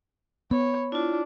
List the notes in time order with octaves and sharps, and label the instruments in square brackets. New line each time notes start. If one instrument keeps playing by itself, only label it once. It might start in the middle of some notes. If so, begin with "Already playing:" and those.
[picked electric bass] B3 [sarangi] C#5 [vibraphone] B5
[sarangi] D4 [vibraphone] E4 F4